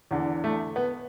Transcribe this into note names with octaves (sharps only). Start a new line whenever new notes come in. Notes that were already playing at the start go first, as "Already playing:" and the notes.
E2 D3
A3
B3